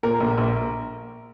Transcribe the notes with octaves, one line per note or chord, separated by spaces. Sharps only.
A#2 A#4
A#1
A#1